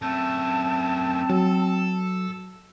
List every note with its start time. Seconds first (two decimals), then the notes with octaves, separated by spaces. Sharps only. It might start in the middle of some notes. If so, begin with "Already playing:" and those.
0.02 F#2 A3 C4 A5
1.30 F#3 A4